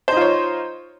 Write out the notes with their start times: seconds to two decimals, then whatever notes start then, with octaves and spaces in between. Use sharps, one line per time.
0.08 C5
0.12 D#4
0.17 F4
0.21 C#5